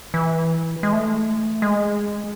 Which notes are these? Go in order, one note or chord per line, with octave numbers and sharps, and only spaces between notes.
E3
G#3
A3
G#3